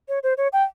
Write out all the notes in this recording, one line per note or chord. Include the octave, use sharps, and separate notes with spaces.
C#5
C5
C#5
G5